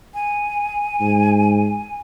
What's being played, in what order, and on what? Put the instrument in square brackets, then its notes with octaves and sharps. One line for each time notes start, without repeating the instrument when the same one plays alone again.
[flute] G#5
[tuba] G#2